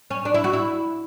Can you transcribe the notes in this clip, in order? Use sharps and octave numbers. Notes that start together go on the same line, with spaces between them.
C#4
D4
E4
F#4
E4